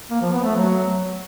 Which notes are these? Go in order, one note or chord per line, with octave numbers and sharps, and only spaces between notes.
A#3
F3
B3
A3
F#3